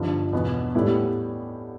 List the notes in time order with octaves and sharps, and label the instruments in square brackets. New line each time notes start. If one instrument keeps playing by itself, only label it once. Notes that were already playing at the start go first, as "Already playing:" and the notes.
Already playing: [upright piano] G1 G2 F3
E2 B2 B3
A2 G3 B3 E4